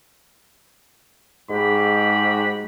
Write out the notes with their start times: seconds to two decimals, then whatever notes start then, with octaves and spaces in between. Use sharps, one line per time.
1.50 G#2 G#3 F#4 G4 B5